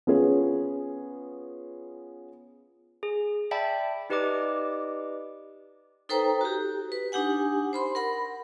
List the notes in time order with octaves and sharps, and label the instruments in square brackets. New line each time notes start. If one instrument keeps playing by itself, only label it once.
[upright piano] B3 C#4 F4 G#4
[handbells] G#4
D5 E5 G5 A5 B5
D#4 G4 B4 D5 D#5 D6
[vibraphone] D#4 A4 B4 C5 G5 A#5
F#4 G4
B4
D4 D#4 G4 F#5 G#5
C5 B5 C6
A#4 F#5 B5